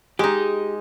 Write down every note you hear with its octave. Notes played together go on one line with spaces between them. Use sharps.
G#3 D#4 G4